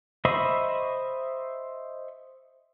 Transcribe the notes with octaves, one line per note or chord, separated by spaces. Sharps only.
C5 D#5 E5 B5 C#6